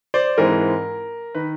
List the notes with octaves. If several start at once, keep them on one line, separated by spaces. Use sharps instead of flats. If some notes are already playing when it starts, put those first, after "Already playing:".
C5 D5
G#2 E3 G#3 C4 A#4
D#3 B4